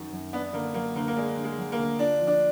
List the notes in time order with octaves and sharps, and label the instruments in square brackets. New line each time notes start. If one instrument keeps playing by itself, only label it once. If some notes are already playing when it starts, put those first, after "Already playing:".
Already playing: [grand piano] F#2 D#3 F#3
F#2
[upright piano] B3 [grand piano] D4
[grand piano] D3 [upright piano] A#3
[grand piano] F#3 [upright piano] A#3
[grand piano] D2 [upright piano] A#3
[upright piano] A#3
[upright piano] G#3 [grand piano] D4
[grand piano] D3
[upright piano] G#3
[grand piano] F#3
[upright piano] A#3
[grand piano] D2
[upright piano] D4 [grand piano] F4
[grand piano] F3
[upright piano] D4